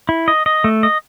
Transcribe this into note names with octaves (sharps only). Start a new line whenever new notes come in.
E4
D#5
D#5
A3
D#5